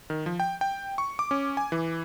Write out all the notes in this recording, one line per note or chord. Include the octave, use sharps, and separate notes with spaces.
D#3
F3
G5
G5
C#6
D6
C#4
G#5
E3